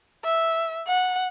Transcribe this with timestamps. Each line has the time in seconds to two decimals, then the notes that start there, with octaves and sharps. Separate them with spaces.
0.24 E5
0.88 F#5